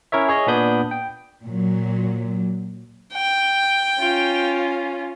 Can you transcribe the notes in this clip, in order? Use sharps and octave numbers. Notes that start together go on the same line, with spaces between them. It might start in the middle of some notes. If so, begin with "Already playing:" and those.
C#4 E4 A#4 C#5 E5
G#4 C#5 D#5
A#2 B3 D4 B5 D#6 G6
G5
A#2 F#3
G5
C#4 F4